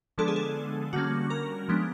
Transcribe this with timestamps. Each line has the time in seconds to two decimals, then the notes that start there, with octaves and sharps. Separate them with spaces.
0.18 D3 F3 G#3 B3 D4 A4
0.28 G#4
0.36 A4
0.93 D3 G3 A#3 C#4 F#4
1.30 A#4
1.69 F3 G#3 B3 D4